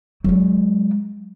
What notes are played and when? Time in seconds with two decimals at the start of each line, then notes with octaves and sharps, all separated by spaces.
0.24 F#3 G#3